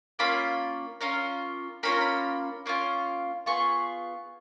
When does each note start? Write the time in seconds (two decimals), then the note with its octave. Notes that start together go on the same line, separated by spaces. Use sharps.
0.19 A#3 C#4 F4 B5
1.01 A#3 C#4 F4
1.83 A#3 C#4 F4 B5
1.92 A#5
2.01 B5
2.66 A#3 C#4 F4
3.46 B3 F4 G#4 C#6